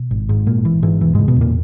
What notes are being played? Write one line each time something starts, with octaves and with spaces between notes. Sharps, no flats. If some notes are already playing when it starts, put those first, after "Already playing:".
Already playing: B2
G#1
G#2
G#1 A#2 A#3
G#1 E3
G#2 E3
E1 E3
G#2 C#3 G#3
B2 B3
E2 A#2 A#3